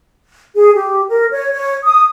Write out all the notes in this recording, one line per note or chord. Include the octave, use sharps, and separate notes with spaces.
G#4
G4
A#4
C#5
C#5
D#6